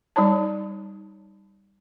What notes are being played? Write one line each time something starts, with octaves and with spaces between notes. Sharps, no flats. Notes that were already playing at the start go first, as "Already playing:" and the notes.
G3 D#4 C#5 A5